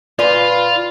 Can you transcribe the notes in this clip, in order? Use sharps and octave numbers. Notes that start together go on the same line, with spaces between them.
A#2 F4 B4 D5 G#5